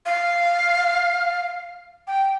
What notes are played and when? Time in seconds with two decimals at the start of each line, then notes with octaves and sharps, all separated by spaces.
0.06 F5
2.07 G5